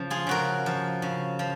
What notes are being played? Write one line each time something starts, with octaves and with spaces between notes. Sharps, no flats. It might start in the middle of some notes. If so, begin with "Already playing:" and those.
Already playing: C#3 F3
F4 G#4
C#3 F#4 A#4
F3
C#3
F3